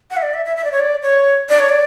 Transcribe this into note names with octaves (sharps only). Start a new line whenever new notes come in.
F#5
E5
D5
E5
E5
E5
D5
C#5
D5
C#5
D5
C#5
D5